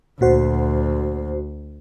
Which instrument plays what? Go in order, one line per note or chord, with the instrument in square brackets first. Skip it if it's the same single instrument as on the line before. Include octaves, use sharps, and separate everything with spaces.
[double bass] D2 [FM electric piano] A#2 F#4 C5